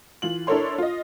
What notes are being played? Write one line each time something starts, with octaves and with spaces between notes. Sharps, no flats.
E3 F4 F#7
D4 E4 A4 A#4 C#5 C6
F4 D#5